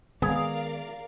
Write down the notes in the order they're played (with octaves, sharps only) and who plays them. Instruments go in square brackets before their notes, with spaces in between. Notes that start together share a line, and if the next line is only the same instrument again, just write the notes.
[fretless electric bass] D#3 G#3 B3 [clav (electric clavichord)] G#4 [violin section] A#4 D5 F5